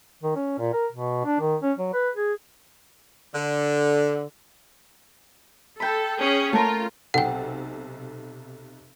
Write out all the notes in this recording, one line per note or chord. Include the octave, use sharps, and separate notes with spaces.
D#3
C#4
A#2
A#4
B2
D4
D#3
C#4
F#3
B4
G#4
D3
A4 G5 B5
C#4 G#4
A3 F4 A#4
B1 C3 A4 F#5 G5